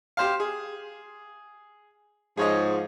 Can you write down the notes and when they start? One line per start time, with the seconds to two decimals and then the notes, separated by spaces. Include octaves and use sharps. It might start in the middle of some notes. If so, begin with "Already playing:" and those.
0.17 G4 C5 F5
0.40 G#4
2.37 G#2 F3 G#4 C#5 D#5